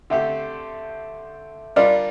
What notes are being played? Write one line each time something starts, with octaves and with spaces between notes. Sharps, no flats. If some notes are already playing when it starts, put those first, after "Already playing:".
D3 A3 C4 G4 E5
G3 D4 F4 A#4 D5